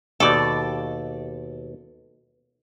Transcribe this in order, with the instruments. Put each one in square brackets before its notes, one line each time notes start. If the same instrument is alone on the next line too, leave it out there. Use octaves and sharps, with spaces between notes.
[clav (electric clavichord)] D#2 B2 [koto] A4 D5